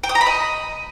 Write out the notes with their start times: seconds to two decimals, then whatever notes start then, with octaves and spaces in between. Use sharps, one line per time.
0.04 G5
0.09 D#6
0.15 A#5
0.21 B5
0.27 D#5